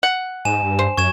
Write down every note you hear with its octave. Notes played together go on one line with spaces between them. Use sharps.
F#5
G#2 G#5 E7
G2
C5
F#2 C#6 G#6 E7